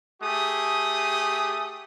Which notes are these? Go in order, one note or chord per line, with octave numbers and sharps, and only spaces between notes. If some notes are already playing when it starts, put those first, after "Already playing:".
A3 G4 G#4 D#6